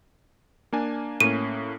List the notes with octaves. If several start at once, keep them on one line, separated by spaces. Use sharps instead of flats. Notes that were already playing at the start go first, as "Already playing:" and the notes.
A#3 D4 G#5
A2 A#3 C#4 D#7